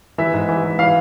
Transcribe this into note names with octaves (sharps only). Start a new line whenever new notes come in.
E3 E5
G#2
E3
E3
E3 F5